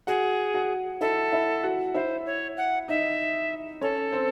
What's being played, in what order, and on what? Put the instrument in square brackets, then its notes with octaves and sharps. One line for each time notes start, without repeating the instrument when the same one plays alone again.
[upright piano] F#4 F#5 [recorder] G#4
[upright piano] F#4 F#5
[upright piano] E4 E5 [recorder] A4
[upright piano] E4 E5
F#4 F#5
[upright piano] E4 E5 [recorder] C5
[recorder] C#5
F#5
[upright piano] D#4 D#5 [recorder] E5
[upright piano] C#4 C#5 [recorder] A4
[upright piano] C4 C5